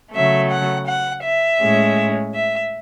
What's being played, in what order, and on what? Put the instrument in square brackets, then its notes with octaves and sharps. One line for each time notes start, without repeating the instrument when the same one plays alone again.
[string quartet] C#3 F#3 A3 E5
F#5
F#5
E5
A2 G#3 C#4
E5